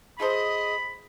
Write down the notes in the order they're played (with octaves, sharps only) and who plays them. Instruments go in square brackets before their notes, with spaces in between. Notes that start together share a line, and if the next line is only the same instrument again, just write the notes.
[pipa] F4 A4 C5 [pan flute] G#4 [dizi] D#5 [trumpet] B5